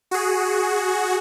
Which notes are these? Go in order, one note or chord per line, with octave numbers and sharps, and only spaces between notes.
F#4 G#4